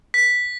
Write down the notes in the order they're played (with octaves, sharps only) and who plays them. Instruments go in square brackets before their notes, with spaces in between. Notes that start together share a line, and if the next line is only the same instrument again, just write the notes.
[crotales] B6